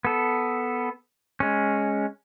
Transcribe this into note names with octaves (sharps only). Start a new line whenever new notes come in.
B3 A4
G#3 C#4